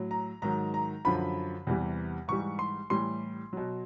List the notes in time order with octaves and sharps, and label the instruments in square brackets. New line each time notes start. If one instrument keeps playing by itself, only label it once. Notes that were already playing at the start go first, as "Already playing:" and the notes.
Already playing: [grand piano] A2 F#3
A#5
G#2 D#3 F#3 A#5
A#5
F#2 D3 F3 B5
E2 C3 E3 G3
G#2 E3 G3 C#6
C6
A2 E3 G3 C6
B2 F#3